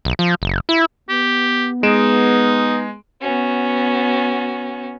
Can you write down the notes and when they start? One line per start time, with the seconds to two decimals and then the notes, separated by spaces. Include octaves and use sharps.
0.05 B1
0.19 F3
0.42 F#1
0.69 E4
1.09 B3 G4
1.83 G#3 D#4 D7 E7
3.22 B3 C#4 F#4